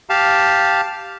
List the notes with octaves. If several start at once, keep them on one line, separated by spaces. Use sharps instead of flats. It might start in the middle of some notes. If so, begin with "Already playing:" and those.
G4 F5 A5